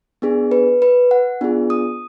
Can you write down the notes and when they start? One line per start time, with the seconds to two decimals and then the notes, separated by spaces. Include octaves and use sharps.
0.22 B3 D4 G#4
0.51 B4
0.82 B4
1.11 F#5
1.41 B3 D4 F4 G#4
1.70 D#6